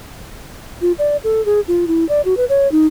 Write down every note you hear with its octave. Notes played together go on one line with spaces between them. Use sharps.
F4
D5
A4
G#4
F4
E4
D5
F#4
B4
C#5
D#4